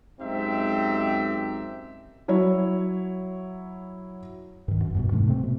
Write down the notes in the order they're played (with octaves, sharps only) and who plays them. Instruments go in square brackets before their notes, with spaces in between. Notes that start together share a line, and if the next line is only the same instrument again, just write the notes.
[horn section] F#2 G#3 C4 D#4 G4 E5
[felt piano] F#3 E4 C#5
[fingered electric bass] G2 D#3
F#2
E2 G2 B2
G#2 C3 E3 A3
C3 A3 C4
B2